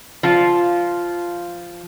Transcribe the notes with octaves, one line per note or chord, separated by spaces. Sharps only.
F3 F4